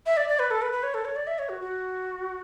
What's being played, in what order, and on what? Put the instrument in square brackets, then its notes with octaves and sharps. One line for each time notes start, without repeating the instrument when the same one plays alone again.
[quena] E5
D5
D5
B4
A4
B4
B4
C#5
A4
C#5
D5
E5
C#5
F#4
F#4